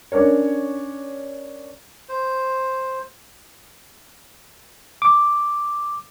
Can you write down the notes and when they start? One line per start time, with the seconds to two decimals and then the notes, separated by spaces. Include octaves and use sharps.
0.12 C#4 D4 A#4 C#5
2.09 C5
5.02 D6